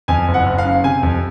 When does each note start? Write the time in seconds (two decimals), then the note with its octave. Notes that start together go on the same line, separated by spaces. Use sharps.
0.08 F2 G#5
0.28 F#1
0.34 F#5
0.46 F#1
0.58 F5
0.65 C#3
0.84 C3 G#5
1.03 F2